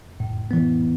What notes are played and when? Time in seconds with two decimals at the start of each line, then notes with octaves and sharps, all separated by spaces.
0.20 A2
0.51 E3 B3